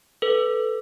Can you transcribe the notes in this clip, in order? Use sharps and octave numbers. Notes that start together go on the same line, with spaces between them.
A4 B4